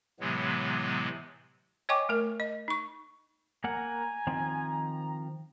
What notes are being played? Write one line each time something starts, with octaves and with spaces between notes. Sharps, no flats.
A2 C3 E3 F#3 G#3 B3
C#5 D#5 G5 G#5 C#6 D6
A3 A#4
D#5
D#4 C#6
A#3 A#4 F#5 G#5 A#5
D#3 F3 C4